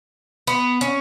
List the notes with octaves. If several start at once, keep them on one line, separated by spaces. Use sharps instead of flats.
B3
C#4